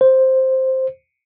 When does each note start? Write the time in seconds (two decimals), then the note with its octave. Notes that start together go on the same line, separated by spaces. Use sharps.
0.01 C5